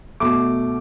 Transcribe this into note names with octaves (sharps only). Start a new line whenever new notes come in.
B2 A3 D6